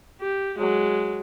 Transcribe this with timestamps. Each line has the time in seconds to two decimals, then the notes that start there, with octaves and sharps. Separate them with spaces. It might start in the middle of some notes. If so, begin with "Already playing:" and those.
0.21 G4
0.59 F#3 G#3